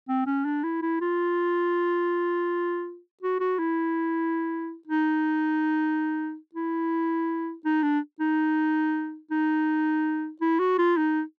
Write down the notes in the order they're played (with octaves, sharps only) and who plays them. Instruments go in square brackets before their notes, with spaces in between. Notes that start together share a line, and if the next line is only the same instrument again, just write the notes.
[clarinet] C4
C#4
D4
E4
E4
F4
F#4
F#4
E4
D#4
E4
D#4
D4
D#4
D#4
E4
F#4
F4
D#4